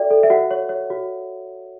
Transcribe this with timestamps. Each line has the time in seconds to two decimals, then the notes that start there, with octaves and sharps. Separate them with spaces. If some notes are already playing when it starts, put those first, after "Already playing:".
Already playing: F#4 A4 D5 E5 G5
0.11 A4
0.23 E5
0.30 F#4 F#5
0.51 C#5
0.69 C#5
0.90 F#4